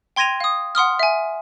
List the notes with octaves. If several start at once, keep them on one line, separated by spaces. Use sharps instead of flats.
G5 C6 G#6 A#6 D#7 F7
F5 D#6
F#5 C6 D#6 F6
E5 G#5